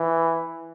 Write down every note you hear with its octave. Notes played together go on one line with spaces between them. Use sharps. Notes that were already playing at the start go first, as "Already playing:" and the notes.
Already playing: E3